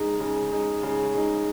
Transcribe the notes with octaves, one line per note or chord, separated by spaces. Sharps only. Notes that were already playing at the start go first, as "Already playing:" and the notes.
Already playing: C#3 G#3 D#4
C#3
G#3 D#4
C#3
G#3 D#4